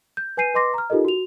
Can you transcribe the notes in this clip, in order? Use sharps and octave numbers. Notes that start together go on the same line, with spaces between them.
G6
B4 G#5 G6 C7 D#7
B4 D#5 C6 D6 A#6 C7
A#5 F6
D#4 F4 G4 A4 A#4 D#5
F#4 F7